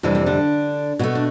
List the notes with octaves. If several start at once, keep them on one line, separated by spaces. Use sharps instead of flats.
F2 C3 E3 G3 D4
C4
D3 D4
B2 A3 B3
D4